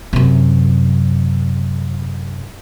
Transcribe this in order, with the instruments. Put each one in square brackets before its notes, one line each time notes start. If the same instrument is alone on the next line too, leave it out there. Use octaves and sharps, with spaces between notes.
[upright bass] F#2 C3